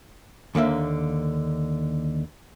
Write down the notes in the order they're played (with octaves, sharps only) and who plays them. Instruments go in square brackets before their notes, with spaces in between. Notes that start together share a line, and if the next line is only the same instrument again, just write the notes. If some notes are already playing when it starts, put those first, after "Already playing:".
[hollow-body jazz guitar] D#2 D3 A#3 E5